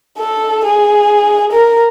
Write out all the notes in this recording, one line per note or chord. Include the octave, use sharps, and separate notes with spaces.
A4
G#4
A#4